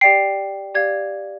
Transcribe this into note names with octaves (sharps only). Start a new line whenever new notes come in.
G4 D5 G5 C7
G4 D5 F5 G#6